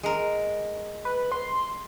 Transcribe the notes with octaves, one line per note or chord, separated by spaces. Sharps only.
G#3 A#4
B4
C6